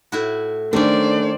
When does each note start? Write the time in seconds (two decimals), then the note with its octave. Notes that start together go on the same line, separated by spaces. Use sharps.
0.12 A2 E4 F#4
0.73 D#3 A3 C#4 D4 C5 D5